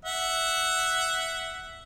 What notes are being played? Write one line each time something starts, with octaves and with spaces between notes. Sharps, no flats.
E5 F#5